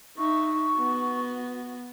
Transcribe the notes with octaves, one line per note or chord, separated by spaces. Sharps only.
D#4 E5 C#6
B3 F#4